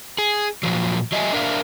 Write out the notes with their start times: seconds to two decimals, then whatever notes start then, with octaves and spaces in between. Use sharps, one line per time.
0.18 G#4
0.63 A#2 F3 F#3
1.12 F#3 D#5 E5 G#5
1.33 D4 A#4 E5 F5